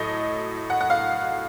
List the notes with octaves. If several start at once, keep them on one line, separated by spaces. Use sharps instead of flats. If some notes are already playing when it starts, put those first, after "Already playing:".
Already playing: A2 F#3 A3 D#5
F#5
F#5
F5